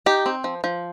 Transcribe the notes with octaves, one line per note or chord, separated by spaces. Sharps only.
D#4 G4
C4
F3
F3